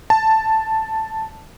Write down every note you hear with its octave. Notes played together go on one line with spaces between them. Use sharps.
A5